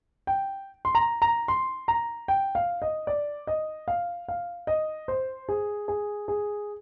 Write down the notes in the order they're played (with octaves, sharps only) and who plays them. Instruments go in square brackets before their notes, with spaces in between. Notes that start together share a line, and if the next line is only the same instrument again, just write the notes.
[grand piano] G5
C6
A#5
A#5
C6
A#5
G5
F5
D#5
D5
D#5
F5
F5
D#5
C5
G#4
G#4
G#4